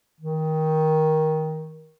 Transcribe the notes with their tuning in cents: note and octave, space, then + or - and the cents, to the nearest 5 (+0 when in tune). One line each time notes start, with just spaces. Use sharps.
D#3 +15